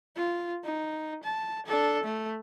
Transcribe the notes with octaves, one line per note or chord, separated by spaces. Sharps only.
F4
D#4
A5
D4 A4
A3